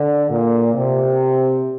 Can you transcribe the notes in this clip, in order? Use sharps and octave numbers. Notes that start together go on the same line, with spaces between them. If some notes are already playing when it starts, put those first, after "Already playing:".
Already playing: D3
A#2
C3